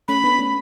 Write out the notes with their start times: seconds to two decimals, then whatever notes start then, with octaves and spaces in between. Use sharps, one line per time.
0.08 A3 C#4 B5
0.24 B3 D4
0.39 A3 C#4